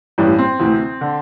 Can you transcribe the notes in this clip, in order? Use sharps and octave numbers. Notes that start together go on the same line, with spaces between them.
A1 G2 E3 G3
C4
D2 C3 E3
D3